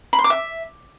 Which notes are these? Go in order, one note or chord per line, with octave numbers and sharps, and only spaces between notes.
B5
C6
D6
E5